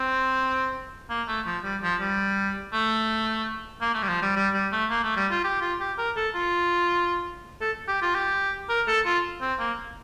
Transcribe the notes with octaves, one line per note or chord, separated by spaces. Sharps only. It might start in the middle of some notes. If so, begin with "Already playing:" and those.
Already playing: C4
A#3
A3
F3
G3
F3
G3
A3
A#3
A3
G3
F3
G3
G3
G3
A3
A#3
A3
G3
F4
G4
F4
G4
A#4
A4
F4
A4
G4
F4
G4
A#4
A4
F4
C4
A#3